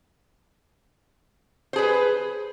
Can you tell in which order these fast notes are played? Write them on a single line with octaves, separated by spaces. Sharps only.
C5 G#4 B4